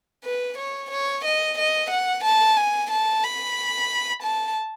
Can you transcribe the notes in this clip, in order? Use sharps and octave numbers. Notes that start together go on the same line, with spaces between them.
B4
C#5
C#5
D#5
D#5
F#5
A5
G#5
A5
B5
A5